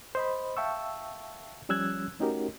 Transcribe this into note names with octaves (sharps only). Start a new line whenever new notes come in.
C5 D#5 B5
E5 F5 G5 A5 C#6 E6
F3 G3 C#4 E6 F#6 G#6
A3 C#4 D#4 F#4 G4 A#4